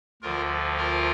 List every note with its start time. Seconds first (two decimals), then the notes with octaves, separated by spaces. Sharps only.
0.22 D2 D3 F3 F4 A#4
0.77 F4 A#4